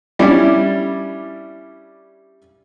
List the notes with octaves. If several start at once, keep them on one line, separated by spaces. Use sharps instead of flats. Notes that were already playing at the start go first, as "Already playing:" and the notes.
G3 C#4 D4 E4